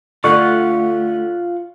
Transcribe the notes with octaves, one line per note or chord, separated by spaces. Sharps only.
D3 A3 F4 D5 F#5 C#6